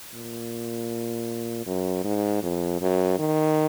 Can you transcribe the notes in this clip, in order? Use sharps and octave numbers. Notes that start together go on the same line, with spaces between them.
A#2
F#2
G#2
F2
F#2
D#3